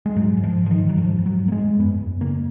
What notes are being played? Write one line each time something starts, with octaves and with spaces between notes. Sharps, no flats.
G#3
G#2 F#3
G#2
F3
G#2
F3
D#3
G#2
F#3
G#2 F3
G#2
F#3
G#2
A#3
G#3
G#2
F#2 B3
F#2
C#3 A#3